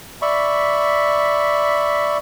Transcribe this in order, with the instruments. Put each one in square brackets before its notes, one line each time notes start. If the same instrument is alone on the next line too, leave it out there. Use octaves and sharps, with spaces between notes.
[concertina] D5 E5 B5 C#6